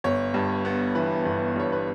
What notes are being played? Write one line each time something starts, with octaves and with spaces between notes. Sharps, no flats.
G1 C#5
G2
B3
E3 B4
G1
G2 C#5
B4